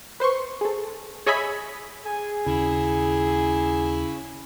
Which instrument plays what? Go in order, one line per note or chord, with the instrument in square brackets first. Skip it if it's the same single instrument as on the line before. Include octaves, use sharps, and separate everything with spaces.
[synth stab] B4 C5 C6 C#6
G#4 A4
G#4 C#5 D#5 E5 G#5 B5
[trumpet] G#4 [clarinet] G#5
[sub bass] D#2 [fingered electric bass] C#3 [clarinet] E4